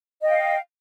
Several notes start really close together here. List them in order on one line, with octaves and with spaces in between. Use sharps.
D#5 G5 F5